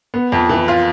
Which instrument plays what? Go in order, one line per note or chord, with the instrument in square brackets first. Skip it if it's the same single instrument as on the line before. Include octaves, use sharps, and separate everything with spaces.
[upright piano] B3
F2
E3
F4